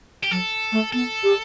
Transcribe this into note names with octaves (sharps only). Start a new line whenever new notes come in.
G4
F#3 A4
A3
B3 A4
G4